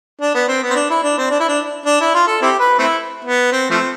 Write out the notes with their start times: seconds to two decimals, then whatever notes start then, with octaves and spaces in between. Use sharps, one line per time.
0.21 D4
0.34 B3
0.48 C4
0.63 B3
0.70 C4
0.75 D4
0.90 E4
1.03 D4
1.18 C4
1.31 D4
1.40 E4
1.49 D4
1.86 D4
2.00 E4
2.14 F4
2.27 A4
2.42 C4 E4 G4
2.59 B4
2.79 A3 C4 E4
3.24 B3
3.52 C4
3.70 F3 A3 C4